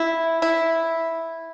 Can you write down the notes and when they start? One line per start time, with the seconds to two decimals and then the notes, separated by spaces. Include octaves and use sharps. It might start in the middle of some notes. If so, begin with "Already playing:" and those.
Already playing: E4
0.42 E4